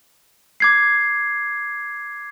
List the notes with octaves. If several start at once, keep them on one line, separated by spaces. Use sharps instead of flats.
D6 G#6 C7